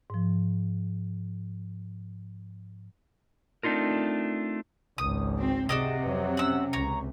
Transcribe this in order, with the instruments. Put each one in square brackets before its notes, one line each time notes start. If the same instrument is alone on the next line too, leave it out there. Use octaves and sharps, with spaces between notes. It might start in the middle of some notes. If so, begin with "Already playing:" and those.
[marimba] G#2 F3
[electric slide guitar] A3 C4 D4 D#4 F4 A#4
[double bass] G#1 C#2 [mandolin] D#6
[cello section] C4 [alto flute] F#4
[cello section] C3 [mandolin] F#4 D5 D#5 [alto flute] G#4
[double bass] F2 F#3 [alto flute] B4
[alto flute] C#4 [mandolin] F#5 E6
[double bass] C#2 [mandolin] C#5 A#5